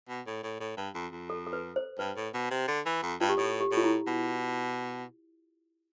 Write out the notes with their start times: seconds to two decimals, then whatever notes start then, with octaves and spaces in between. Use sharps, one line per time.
0.09 B2
0.26 A2
0.43 A2
0.60 A2
0.77 G2
0.95 F2
1.12 F2
1.30 A4
1.47 A4
1.53 B4
1.76 C5
1.99 G2 B4
2.17 A2
2.34 B2
2.51 C3
2.68 D3
2.86 E3
3.03 F2
3.20 G2 F4
3.29 G4
3.38 A2 A4
3.60 G4
3.72 A2
3.77 F4
3.84 E4
4.07 B2